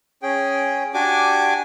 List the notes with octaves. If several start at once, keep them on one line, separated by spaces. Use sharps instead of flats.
C#4 G#4 G5
D4 F#4 G4 G#5 D6